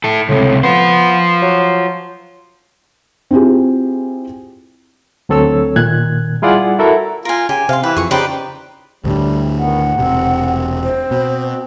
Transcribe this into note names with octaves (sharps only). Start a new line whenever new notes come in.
E4 A4
C#2 A2 C3
B3 F4 C5
F#3
C4 E4 F4 G4 G#4
D2 F#3 C4 A4 C#5 E6
A#2 D#3 F#6 G#6
G3 E4 F4 G#4 D5 F#5
E4 F#4 A4 A#4 E5 A#5
F4 A#4 G#5
C#3 G4 G#5
C3 F5 C6
E3 G4 B4
F2 G#4 C#6
C#3 D#4 G4 B4 C5 D5
D2 A2 D3 G3
D#3 B3 F#5
E1 C3 C4
C5
B2